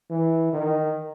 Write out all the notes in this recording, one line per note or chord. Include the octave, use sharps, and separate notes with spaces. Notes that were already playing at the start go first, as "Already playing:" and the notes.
E3
D#3